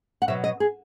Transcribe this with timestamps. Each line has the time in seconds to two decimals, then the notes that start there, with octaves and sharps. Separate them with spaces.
0.22 F#5
0.28 B2 F#3 E5
0.44 D#5
0.60 G#4